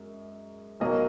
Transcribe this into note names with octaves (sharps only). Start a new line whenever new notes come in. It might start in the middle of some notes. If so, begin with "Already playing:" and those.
Already playing: F#2 G#3
B1 B2 F#3 A#3 D#5